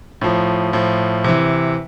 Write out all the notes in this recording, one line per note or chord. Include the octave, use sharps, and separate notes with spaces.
A2 F3
A2 F3
C3 E3